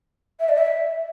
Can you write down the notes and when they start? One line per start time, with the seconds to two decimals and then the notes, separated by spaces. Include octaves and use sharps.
0.40 E5
0.49 D5
0.57 E5